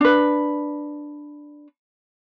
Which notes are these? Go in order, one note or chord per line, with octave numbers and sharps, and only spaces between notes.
D4 B4